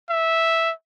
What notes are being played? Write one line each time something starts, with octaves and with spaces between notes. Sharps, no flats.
E5